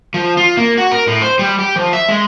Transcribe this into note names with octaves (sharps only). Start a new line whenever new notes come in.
F3
F4
A#3
F#4
A#4
A2
C5
G3
G4
F3
E5
G#3